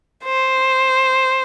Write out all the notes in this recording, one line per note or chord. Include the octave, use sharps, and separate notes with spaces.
C5